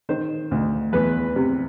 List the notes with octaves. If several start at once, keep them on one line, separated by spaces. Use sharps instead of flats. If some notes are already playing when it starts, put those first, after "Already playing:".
D#3 C5
D2
E2 B4
C3